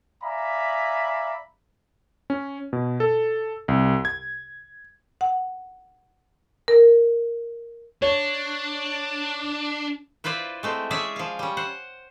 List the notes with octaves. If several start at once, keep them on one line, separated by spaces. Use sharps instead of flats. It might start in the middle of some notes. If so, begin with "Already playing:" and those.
D5 E5 F5 G#5 A#5 B5
C#4
B2
A4
C2
G#6
F#5
A#4
D4 C#5
E4 F4 B4 C5 D5
G#3 A3 C4
C#4 G#4 D5 E5
F3 F5
G3 C#4
C5 F#5